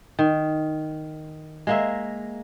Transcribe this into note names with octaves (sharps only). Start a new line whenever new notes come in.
D#3
G#3 A#3 E5